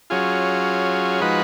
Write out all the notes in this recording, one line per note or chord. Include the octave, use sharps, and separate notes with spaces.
F#3 C#4 F4 G#4
F3 G#3 D#4 F#4 B4